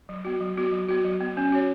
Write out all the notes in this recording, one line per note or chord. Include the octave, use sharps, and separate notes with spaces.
F#3
B3 F#4
F#3
B3 F#4
F#3
B3 F#4
F#3
B3 F#4
C#4
F#4 C#5